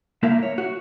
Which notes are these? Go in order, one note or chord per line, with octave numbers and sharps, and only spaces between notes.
A3 A#3 E4 A#4 E5 F5
C#5
F#4